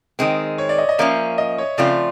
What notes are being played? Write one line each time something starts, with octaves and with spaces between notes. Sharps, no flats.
D#3 G#3 C4
C#5
D5
D#5
D#5
F3 A#3 C#4 E5
D#5
C#5
C#3 F3 A3 C4 F4 D5